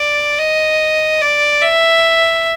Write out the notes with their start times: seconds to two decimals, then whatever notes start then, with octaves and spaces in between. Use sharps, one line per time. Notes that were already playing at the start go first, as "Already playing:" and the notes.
Already playing: D5
0.39 D#5
1.21 D5
1.62 E5